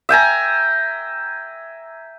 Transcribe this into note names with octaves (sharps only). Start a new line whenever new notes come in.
E5 G5 G#5 A#5